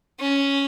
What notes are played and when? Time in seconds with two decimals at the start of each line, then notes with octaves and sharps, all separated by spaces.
0.20 C#4